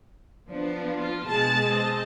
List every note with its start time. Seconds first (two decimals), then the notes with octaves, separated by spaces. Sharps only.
0.49 F3 B3 D4
0.96 F4
1.26 B2 G#3 A5
1.68 C4 D#5 A5